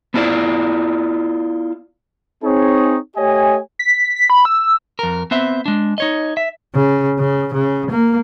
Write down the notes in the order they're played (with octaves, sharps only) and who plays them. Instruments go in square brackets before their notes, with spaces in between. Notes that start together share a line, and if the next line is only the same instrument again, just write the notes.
[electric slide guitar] B3 D4 E4 F4 D5
[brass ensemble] C4 D#4 G#4 C#5
A3 G4 C#5 D#5 G#5
[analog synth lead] B6
B6
B5
E6
[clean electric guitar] F2 A#4
B3 C4 C5 E5
G#3 D4
D#4 C#5 D#5
E5
[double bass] C#3
C#3
C#3
A#3